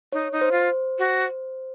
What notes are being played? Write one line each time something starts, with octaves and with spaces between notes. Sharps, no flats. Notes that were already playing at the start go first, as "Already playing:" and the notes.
D#4 C#5
D#4
C5
F4
F#4